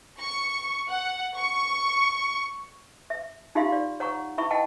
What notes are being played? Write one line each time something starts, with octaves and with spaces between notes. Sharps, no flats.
C#6
F#5
C#6
E5
D#4 F4 G4 E5 F5 C6
D5
C#5 F#5 A#5 C#6
E4 E5 B5 C#6
D#5 F#5 G5 A5